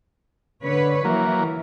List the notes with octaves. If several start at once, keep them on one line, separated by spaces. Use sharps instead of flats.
D3 B4 C#5
E3 F#3 A#3